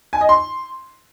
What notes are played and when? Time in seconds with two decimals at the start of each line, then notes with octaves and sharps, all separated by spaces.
0.13 G#5
0.21 D#5
0.29 C6